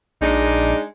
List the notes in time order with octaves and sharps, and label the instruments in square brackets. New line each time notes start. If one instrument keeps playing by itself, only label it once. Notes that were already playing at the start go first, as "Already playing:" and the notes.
[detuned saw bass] A#1 [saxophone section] G#3 D4 D#4